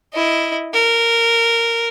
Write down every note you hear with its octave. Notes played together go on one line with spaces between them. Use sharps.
E4 D#5
A#4